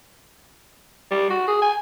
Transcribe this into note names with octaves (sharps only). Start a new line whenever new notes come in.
G3
F#4
G#4
G#5